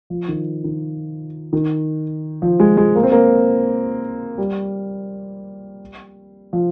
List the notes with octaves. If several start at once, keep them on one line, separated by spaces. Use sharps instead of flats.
F3
D#3
D#3
D#3
F3
G#3
G#3
A#3
C4
A#3
G3
F3